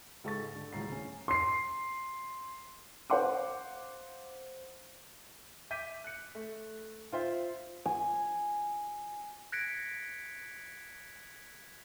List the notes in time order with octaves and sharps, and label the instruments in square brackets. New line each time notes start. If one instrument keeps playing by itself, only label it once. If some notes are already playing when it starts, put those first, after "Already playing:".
[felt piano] C#2 G#2 A4 A5 C#6 A6
D3
D#1 C#2 A2 A#5 C7
C#4
[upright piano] C6 C7
C5 F5 F#5 C6 D6
[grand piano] E5 D6 G6 B6 D#7
F#6 C#7
A3
F4 C5 E5
[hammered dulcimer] G#5
[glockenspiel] F#6 G#6 A#6 B6 C#7 D7